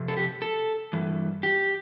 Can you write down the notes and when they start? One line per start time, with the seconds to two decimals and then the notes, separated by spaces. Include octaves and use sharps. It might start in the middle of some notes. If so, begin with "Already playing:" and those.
Already playing: F2 C3
0.08 A4
0.17 G4
0.42 A4
0.93 G2 E3
1.43 G4